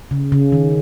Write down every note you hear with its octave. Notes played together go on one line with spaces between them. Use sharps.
C#3
C#3
D#3